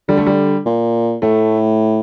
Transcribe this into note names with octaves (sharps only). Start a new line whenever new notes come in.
D3 G3
A3
G3
A#2
A2 A3